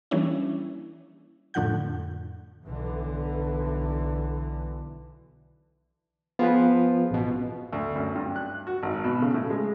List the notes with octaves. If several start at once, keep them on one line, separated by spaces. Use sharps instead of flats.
E3 G3 A#3 C#4 D4 E4
F2 A2 D3 F3 F#5 G6
B1 D3 E3
F3 B3 F4 G#4 B4
A1 B2
D2
F#2
G2
F#6
F#4
G#1
B2
C#3
A2
G#3